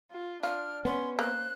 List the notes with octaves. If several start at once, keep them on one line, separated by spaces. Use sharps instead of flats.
F4
D4 F4 F6
B3 C#4 C6
A#3 C5 F#6